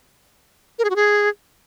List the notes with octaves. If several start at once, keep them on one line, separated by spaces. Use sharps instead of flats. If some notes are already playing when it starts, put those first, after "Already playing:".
A#4
G#4
F#4
G#4